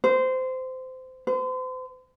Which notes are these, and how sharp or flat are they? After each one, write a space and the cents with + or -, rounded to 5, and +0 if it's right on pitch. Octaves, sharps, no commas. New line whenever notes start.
C5 -20
C5 -40